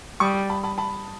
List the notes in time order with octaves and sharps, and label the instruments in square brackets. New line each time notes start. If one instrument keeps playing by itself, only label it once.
[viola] G3 [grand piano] C#6 D#6
[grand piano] A5 B5
A5 B5
A5 B5